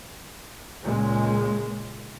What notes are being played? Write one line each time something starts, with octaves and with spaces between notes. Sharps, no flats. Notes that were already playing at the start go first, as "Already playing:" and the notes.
C#2 A#2 G#3